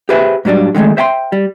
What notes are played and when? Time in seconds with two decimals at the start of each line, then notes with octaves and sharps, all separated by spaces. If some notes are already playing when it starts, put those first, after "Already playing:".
0.09 G4 G#4 B4 C5 E5
0.45 G#2 F#3 G3 C4 D4
0.75 D3 D#3 F#3 G#3 A3
0.97 C5 E5 G5 G#5 C6
1.32 G3